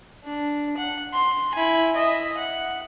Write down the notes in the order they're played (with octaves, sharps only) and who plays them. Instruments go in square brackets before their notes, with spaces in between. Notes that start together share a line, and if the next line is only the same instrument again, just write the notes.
[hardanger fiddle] D4
F#5
C6
E4 G#5
D#5 E5
F#5